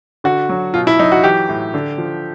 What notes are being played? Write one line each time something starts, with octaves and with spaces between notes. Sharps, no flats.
D3 F#4
F#3
B2 F4
E4
F#3 D#4
F#4
E3 G4
A2
D3
F3